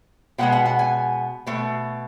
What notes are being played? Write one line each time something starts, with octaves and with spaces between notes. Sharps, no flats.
B2 G#3 B3 F#5
F#5
F#5
G#5
B2 A3